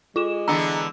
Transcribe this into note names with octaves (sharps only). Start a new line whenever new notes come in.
G#3 F4 D6 E7
D3 E3 B3 A#5 E6